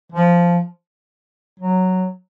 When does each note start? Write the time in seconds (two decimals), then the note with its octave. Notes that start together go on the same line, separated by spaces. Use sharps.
0.12 F3
1.60 F#3